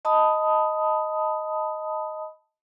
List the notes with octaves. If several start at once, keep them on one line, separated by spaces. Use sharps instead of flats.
D#5 A5 B5 D#6